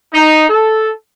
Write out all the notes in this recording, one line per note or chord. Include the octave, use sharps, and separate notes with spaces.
D#4
A4